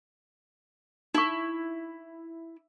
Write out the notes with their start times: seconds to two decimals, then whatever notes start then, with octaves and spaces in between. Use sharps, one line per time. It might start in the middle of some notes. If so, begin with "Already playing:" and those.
1.15 D#4 E4 C#6